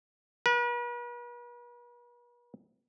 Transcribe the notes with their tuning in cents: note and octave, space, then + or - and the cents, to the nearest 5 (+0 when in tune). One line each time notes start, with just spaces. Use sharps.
B4 -45